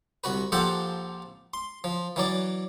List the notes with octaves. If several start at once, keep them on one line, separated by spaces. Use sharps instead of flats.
C2 F#4 B4
A#1 F3 G4 A4 C5 F#5
C6
F3
E3 F#3 D5